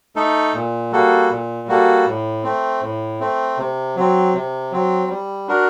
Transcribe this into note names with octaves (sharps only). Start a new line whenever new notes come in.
A3 D#4 A4
A#2
G3 A#3 F#4 A4
A#2
G3 A#3 F#4 A4
A2
A3 C4
A2
A3 C4
C3
F#3 C4
C3
F#3 C4
G3
D4 F#4 A#4